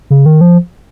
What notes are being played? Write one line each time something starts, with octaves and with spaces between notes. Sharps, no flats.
C#3
D#3
F3